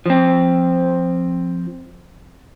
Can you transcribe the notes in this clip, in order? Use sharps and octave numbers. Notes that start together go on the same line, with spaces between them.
F3 C4